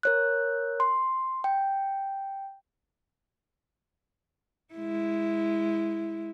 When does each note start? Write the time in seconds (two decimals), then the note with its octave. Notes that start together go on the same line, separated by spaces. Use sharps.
0.03 A#4 C#5 F#6
0.80 C6
1.44 G5
4.74 G#3 E4